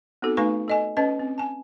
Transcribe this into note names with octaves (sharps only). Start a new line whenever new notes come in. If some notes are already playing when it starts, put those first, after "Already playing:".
B3 C4 D#4 F#4 A4
A3 D#4 B4 F5 G#5 C#6
A4 D#5 G#5
C#4 B4 C#5 D#5 A5
C4
G#5 A5